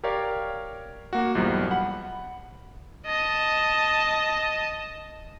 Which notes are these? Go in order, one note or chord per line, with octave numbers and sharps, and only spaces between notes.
G4 A#4 C#5 D5 F5
A#3 F#4
B1 E2 G2 F3 G3
F#5 B5
D#5 A5